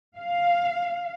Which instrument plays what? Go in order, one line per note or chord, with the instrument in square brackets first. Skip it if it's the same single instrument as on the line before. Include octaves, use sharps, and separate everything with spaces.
[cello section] F5